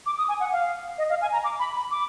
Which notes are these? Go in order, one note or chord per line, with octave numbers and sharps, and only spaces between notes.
D6
D#6
G#5
F#5
F5
D#5
F5
G#5
A#5
D6
B5
B5
D6